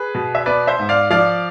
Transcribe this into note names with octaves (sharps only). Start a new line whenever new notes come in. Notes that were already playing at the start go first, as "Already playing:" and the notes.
Already playing: G#4 B4
B2
E5
B3 B4 D5
C5 E5
G#2
D5 F5
F3 D5 F5